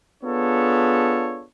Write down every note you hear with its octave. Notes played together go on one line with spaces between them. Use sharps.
B3 D4 F4 G#4 A4 C#5